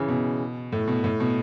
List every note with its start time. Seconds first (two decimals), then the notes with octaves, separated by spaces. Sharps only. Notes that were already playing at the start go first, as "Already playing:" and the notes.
Already playing: C#3 E3
0.08 B2
0.72 A2
0.88 B2
1.04 A2
1.20 B2